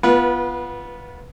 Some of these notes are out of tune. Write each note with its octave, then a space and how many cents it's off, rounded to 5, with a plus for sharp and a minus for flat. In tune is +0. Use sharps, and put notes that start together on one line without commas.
B3 -5 F4 -10 B4 -30